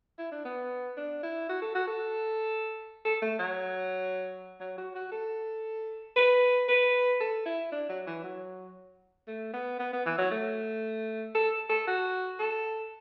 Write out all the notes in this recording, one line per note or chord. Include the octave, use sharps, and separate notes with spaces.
E4
D4
B3
D4
E4
F#4
A4
F#4
A4
A4
A3
F#3
F#3
F#4
F#4
A4
B4
B4
A4
E4
D4
F#3
E3
F#3
A3
B3
B3
B3
E3
F#3
A3
A4
A4
F#4
A4